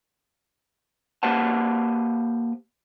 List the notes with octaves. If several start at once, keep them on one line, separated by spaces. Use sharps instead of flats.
A#3 G4 B4 C5 F#5 A5